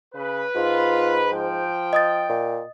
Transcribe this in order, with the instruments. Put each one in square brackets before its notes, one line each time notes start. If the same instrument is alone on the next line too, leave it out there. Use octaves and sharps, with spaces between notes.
[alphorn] C#3 [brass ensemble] B4
[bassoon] G#2 [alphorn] F4
[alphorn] F3 [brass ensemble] G5
[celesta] D#5 D#6 A6
[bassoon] A#2